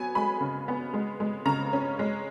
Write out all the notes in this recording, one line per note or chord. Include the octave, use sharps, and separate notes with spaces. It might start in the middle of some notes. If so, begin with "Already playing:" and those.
Already playing: F#3 B3 G#5
G#3 B5
C#3
B3
G#3
G#3
C#3 A#5
C#4
G#3